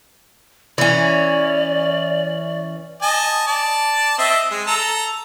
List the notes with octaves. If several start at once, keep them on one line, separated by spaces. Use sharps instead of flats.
E3 C#4 D5
D#5 G#5 A5
D5 A5
C4 D#5 E5
G#3
A4 A#5